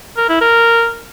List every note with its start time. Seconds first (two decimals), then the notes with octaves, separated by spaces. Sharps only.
0.17 A#4
0.29 E4
0.41 A#4